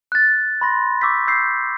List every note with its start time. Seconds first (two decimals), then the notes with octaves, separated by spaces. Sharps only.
0.12 F#6 A6
0.61 B5 C6 A#6
1.02 C#6 D6 E6 G6 B6
1.28 E6 G6 C7